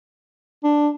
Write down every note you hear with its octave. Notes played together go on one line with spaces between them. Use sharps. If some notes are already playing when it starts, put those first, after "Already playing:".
D4